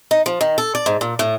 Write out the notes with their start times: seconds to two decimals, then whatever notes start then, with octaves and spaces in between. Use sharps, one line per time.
0.11 D#4
0.26 F3
0.41 D#3
0.58 A4
0.75 D5
0.86 G#2
1.01 A#2
1.19 A2